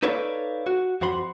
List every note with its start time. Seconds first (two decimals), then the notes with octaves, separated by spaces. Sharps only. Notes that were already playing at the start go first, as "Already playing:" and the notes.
0.03 D#4 A4 B4 C#5 D5 F5
0.67 F#4
1.01 F2 F#4 C5 B5 C6